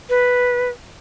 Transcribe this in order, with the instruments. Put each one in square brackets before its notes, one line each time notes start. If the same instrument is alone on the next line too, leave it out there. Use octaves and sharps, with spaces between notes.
[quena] B4